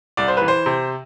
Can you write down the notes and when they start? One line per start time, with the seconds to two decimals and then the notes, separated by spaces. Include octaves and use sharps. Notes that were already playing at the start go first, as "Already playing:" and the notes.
0.17 C2 D5
0.28 C5
0.37 E3 B4
0.48 C5
0.66 C3